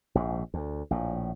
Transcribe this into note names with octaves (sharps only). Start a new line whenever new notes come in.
A#1 G#2
D2
A#1 A2